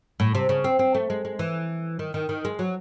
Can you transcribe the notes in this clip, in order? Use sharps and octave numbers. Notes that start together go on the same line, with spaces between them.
A2
C3
C#3
C4
C4
A3
G#3
G#3
E3
D#3
D#3
D#3
G#3
F#3